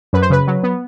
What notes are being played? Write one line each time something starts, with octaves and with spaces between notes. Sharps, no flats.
F#2 B4
C5
C#3 B4
F#3
B3